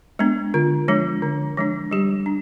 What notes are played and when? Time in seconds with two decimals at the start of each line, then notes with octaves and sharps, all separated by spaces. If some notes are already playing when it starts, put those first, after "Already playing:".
0.19 G#3 B3 D4
0.54 D3 F4
0.88 F3 G#3 D4
1.22 D3
1.57 F3 G#3 D4
1.91 G3 G4
2.26 D4